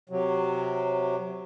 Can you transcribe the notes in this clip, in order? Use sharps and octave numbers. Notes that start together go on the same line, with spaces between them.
C3 F#3